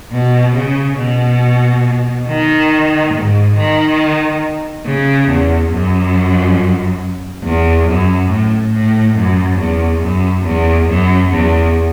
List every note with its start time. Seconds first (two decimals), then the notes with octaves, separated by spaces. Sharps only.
0.13 B2
0.55 C#3
0.99 B2
2.28 D#3
3.14 G#2
3.57 D#3
4.86 C#3
5.29 E2
5.73 F#2
7.44 E2
7.88 F#2
8.30 A2
8.73 A2
9.16 F#2
9.59 E2
10.03 F#2
10.46 E2
10.89 F#2
11.32 E2